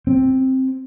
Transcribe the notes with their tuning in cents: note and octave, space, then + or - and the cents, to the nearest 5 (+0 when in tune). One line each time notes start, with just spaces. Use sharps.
C4 +5